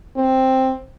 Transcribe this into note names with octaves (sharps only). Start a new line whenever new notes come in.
C4